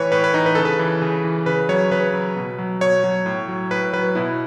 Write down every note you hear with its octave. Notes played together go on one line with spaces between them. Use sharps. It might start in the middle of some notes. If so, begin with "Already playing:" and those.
Already playing: A2 E3 B4 C#5
A2 B4
B4
E3 D#4
B4
C#3 A4
B4
E3
C#3
E3
C#3 B4
F#3 C#5
C#3 B4
F#3
B2
F#3
B2 C#5
F#3
A2
F#3
A2 B4
F#3 B4
B2 E4